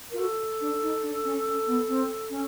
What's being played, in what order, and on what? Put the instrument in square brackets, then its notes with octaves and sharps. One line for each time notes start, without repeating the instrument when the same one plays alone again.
[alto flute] F4 [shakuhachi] A#4
[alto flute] F#4 [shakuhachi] A4
[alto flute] D4
D#4
D4
C#4
C#4
B3
C4
C#4